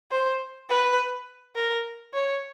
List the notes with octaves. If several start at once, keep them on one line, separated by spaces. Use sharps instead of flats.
C5
B4
A#4
C#5